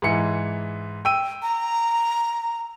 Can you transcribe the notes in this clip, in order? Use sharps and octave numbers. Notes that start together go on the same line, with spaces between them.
G#2 E3 C#7
G5 E6 D#7
A#5